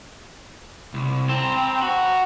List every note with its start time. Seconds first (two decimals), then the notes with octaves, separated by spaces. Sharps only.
0.94 C2
1.29 C4 A5 A#5
1.82 F#4